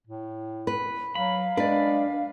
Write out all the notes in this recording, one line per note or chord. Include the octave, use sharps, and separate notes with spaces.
A2
B4
F#3 F5 B5
G#3 D4 B4 D5